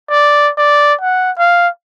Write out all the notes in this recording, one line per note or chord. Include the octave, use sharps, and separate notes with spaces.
D5
D5
F#5
F5